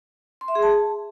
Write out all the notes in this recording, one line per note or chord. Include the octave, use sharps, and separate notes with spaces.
C6
E5
G#4
A5